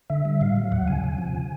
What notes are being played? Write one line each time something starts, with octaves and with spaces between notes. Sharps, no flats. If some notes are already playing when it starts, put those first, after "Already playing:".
D3 E5
G3
A2 F5
F#3
D#2 F#5
C#3 G#5
C3
F3
C#3